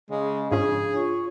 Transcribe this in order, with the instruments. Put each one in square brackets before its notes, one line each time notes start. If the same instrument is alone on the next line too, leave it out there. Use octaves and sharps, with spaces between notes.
[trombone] C#3 [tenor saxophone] G#3
[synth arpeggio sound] G#2 F3 C#4 [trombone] C#3 [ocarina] D4 [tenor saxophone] G#4
[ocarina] F4 [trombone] C#5